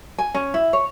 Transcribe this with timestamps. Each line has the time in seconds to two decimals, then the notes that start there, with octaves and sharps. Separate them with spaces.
0.18 G#5
0.34 C#4
0.54 E4
0.73 C#5